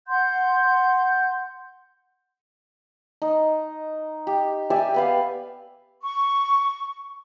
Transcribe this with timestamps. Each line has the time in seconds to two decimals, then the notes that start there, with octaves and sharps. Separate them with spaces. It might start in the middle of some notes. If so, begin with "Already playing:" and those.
0.07 F#5 C6 G6
3.22 D#4
4.27 G4
4.70 G4 D5 E5 G#5
4.94 B3 B4 F5
6.03 C#6